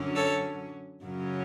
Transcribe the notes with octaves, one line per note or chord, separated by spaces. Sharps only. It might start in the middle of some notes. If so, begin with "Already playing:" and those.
Already playing: F#2 D3 F#3 C#4
A4 C#5
F#2 C#3 F#3 C#4